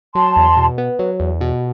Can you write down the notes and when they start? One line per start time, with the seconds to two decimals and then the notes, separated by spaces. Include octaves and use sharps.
0.15 F#3 A5 C6
0.36 E2
0.57 B2
0.78 B3
0.99 F#3
1.20 E2
1.41 B2